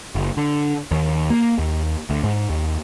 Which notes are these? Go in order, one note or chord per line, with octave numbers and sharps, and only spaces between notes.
F#1
D3
D#2
A#3
D#2
D2
G#2
D#2